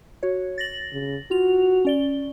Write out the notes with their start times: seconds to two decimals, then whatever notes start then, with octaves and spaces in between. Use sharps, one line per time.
0.23 F#4 C#5
0.58 A6 A#6 F#7
0.93 C#3
1.31 F4 F#4 F7
1.85 C#4 D5 G7